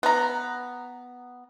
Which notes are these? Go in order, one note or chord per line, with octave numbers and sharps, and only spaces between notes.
B3 A#5